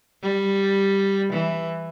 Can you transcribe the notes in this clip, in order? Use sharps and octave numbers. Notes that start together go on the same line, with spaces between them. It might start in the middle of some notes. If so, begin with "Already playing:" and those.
G3
E3